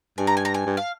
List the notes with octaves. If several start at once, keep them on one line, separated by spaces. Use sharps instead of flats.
G2 G#5
A#5
G#5
A#5
G#5
G2
F5